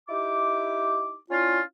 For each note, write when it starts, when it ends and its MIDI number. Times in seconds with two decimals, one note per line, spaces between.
0.08 1.15 63
0.08 1.15 64
0.08 1.15 67
0.08 1.15 86
1.30 1.61 61
1.30 1.61 62
1.30 1.61 64
1.30 1.61 65